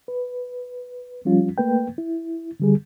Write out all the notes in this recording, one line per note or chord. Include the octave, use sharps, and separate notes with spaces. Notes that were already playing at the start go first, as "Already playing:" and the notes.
B4
F3 G3 C#4 F4
A3 A#3 B4 G5
E4
D3 G3 G#4